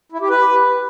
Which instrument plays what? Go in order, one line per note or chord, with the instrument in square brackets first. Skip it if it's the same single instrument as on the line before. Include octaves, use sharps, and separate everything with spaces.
[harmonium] E4
G4
B4